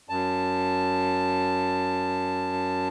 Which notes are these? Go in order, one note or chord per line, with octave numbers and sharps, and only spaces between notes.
F#2 A5